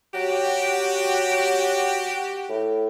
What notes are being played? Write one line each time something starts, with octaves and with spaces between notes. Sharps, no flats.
F#3 F#4 G4
A2